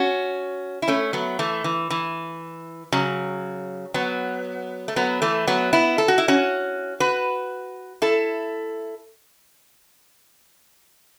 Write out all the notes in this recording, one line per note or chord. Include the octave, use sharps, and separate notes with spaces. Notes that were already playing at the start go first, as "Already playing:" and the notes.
Already playing: C#4 F#4
E4
A3 C#4
F#3 B3
E3 A3
E3
E3
C#3 F#3
F#3 B3
A3
F#3 B3
E3 A3
F#3 B3
B3 E4
A4
F#4
E4
C#4 F#4
F#4 B4
E4 A4